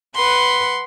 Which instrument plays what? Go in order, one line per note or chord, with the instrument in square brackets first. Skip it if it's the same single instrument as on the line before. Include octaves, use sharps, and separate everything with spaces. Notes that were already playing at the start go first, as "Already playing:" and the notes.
[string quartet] B4 F#5 B5 C6